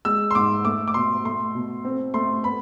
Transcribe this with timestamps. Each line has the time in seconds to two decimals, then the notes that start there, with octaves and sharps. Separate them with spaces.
0.05 G#3 E6
0.31 C6
0.35 G#2 D6
0.65 A3 D6
0.88 D6
0.94 B2 C6
1.25 A3 C6
1.55 B2
1.85 C4
2.14 A3 C6
2.44 B3 B5